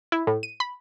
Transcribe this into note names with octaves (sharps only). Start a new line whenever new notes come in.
E4
A2
D#7
B5